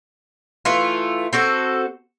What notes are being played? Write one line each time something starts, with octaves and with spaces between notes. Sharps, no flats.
E3 A3 F4
C4 F#4 A4